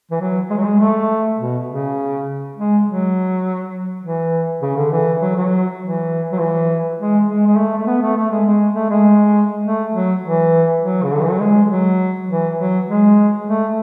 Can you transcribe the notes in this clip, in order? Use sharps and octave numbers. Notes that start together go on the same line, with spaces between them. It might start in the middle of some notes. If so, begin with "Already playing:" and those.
E3
F#3
G#3
F#3
G#3
A3
B2
C#3
G#3
F#3
E3
C#3
D3
E3
F#3
F#3
E3
F#3
E3
G#3
G#3
G#3
A3
A3
B3
A3
A3
G#3
G#3
A3
G#3
A3
F#3
E3
F#3
C#3
D3
E3
F#3
G#3
F#3
E3
F#3
G#3
A3